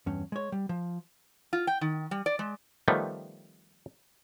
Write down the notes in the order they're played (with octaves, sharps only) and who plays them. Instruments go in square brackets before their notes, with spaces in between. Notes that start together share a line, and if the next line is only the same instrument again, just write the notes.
[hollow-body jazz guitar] E2 G2 C#4
G#3 C#5
G3
F3
[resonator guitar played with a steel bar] F4
G5
D#3
G3
D5
G#3
[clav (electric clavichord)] D#3 F3 G3 A3 B3